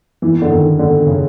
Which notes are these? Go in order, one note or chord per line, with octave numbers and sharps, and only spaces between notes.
E3
D3
D#3
D3
C#3